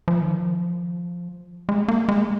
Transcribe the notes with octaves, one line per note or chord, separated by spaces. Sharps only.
F3
D#3
F3
G#3
A#3
G#3